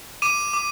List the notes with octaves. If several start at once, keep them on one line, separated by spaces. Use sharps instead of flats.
D6 D#7
D6